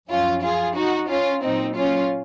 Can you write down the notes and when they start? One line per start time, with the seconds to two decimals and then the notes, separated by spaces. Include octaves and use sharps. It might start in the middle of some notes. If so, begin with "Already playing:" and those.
0.10 F#2 F3 C#4 F4
0.43 F4 G#4
0.76 D#4 F#4
1.09 C#4 F4
1.43 A#2 F#3 C4 D#4
1.76 C#4 F4